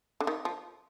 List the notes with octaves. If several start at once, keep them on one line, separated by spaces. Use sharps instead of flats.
D3
D#3
F3